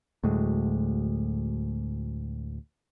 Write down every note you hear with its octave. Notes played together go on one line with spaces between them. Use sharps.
D2 A2 F#3 G#3